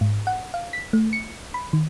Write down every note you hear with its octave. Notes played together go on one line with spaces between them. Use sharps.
G#2
F#5
F5
B6
A3
C#7
B5
D#3